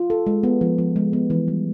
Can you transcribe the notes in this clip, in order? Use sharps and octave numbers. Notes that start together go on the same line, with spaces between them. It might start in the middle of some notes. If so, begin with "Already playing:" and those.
Already playing: F4
A4
G#3
B3
F3
F3
G#3
B3
E3
G3